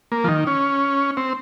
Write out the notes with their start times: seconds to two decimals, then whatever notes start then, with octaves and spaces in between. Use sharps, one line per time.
0.12 A#3
0.24 F3
0.28 D#3
0.47 C#4
1.17 C4